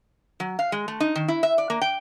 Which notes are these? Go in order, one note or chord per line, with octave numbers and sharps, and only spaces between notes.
F#3
F5
G#3
A3
D#4
D#3
E4
E5
D5
A#3
G5